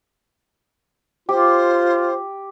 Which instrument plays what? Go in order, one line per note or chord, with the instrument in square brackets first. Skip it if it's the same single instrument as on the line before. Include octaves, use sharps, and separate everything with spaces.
[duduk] F4 [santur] G4 [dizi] C5